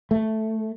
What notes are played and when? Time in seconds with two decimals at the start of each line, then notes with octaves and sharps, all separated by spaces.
0.11 A3